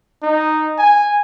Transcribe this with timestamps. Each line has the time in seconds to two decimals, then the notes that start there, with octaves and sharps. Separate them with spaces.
0.23 D#4
0.79 G#5